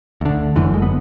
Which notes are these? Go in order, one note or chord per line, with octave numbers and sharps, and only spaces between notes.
D2 D3
F#1 F#2 D3 E3
G#3
B3